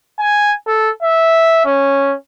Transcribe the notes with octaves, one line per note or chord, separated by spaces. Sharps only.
G#5
A4
E5
C#4